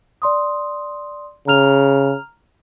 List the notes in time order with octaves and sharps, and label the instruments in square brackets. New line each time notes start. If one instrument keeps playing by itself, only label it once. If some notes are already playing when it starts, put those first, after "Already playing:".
[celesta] D5 C6 D#6
[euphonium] C#3 [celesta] A#5 F6 F7